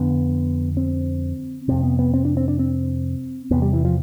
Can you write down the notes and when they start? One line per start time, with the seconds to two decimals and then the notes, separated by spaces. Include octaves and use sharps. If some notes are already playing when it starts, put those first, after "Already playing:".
Already playing: F2 D3 B3
0.77 C4
1.68 F2 C3 C4
1.83 B3
1.99 B3
2.14 C4
2.25 D4
2.37 C4
2.48 D4
2.59 C4
3.51 E2 C3 B3
3.62 G3
3.73 E3
3.85 F3